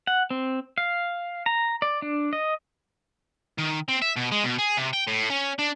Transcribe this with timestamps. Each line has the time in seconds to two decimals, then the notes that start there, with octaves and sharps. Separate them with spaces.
0.07 F#5
0.30 C4
0.78 F5
1.46 A#5
1.82 D5
2.02 D4
2.33 D#5
3.58 D#3
3.88 C4
4.02 E5
4.16 B2
4.32 G#3
4.44 B2
4.59 G#4
4.77 C3
4.93 G5
5.07 A2
5.30 C#4
5.59 D4